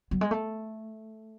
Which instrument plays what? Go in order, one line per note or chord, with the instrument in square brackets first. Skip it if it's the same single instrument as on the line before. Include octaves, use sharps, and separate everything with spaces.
[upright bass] F#3
G#3
A3